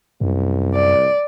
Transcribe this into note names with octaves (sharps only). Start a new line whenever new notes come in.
C2 F#2
D5